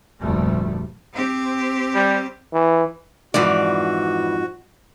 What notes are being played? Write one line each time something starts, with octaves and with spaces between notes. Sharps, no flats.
F1 D2 A#2 G3 A3
C4 G4
G3
E3
F2 G#2 E3 F3 F#4 D5